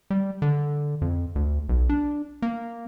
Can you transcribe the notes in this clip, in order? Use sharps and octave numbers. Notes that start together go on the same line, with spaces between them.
G3
D3
F2
D2
B1
D4
A#3